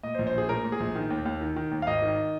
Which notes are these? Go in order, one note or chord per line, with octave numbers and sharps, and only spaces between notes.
A#2 D#5
C5
A#1
C5
A#1 G#4
A#2 A#4
A#2
G#4
A#1
D#3
D#2
D#2
D#3
D#3
D#2
F5
G#1 D#5
D#3